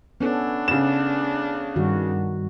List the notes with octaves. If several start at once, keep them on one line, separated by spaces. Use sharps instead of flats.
B3 C#4 D4 A4
C#3 E7
G2 D#3 G3 F#4